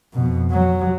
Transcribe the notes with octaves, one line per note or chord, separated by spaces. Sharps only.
F2 B2
F#3